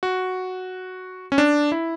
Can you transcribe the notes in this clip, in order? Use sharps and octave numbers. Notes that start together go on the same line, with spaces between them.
F#4
C#4
D4
E4